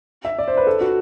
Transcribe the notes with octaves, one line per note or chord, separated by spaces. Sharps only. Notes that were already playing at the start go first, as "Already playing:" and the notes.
E5
D5
C5
B4
A4
F#4